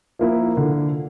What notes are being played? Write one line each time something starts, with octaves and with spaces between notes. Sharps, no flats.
F3 A#3 E4
D3